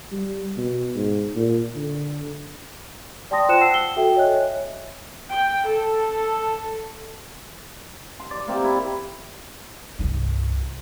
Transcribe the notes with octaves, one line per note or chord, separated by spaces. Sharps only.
G3
B2
G#2
A#2
D3
D5 G5 A5 C6 D#6 A#6
F4 C5 G5 F#6 C#7 E7
F#5 A5 E6 C7
G7
F#4 A4 E5 G5
C#5 D#5 E5 G#5 F#6
G5
A4
C6
D5
A#3 C4 G4 E5
A#3 E4
C2 G2